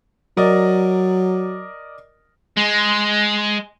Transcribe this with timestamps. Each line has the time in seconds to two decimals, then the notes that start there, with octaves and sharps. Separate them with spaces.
0.37 F#3 A#4 D5 D#5
2.57 G#3